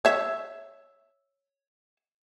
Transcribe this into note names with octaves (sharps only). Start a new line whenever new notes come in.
C#5 E5